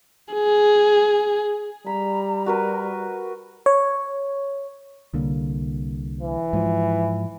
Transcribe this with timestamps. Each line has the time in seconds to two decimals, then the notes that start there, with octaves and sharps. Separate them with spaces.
0.34 G#4
1.86 G3 A#5 B5
2.46 F#4 A#4 B4
3.66 C#5
5.14 C2 D3 A#3
6.20 E3
6.53 G#2 F3